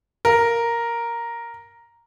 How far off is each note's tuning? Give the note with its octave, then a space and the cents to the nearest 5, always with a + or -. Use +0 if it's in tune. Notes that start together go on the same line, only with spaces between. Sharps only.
A#4 +0 F5 +0